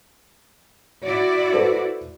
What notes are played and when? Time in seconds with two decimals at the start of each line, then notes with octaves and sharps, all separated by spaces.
1.06 E4 F#4 D5
1.53 A4 B4 C5